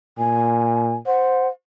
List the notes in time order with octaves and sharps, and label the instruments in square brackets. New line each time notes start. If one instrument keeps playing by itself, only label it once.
[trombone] A#2 [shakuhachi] G#5
[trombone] C5 [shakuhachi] F#5